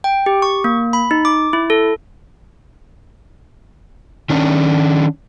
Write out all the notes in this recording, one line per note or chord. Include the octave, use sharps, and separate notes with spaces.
G5
G4
C#6
A#3
B5
D#4
D6
E4
A4
D#3 C#4 D4